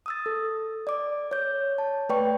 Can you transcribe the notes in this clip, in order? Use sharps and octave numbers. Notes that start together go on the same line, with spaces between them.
D#6 E6 A6
A4
D5 D6
C#5 G6
A5
A3 B4 D5 G5 C#6